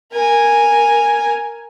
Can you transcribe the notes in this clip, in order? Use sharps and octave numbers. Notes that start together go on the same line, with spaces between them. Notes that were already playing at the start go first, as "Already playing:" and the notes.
A#4 G#5